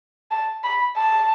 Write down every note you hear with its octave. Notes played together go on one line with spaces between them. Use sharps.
A5
B5
A5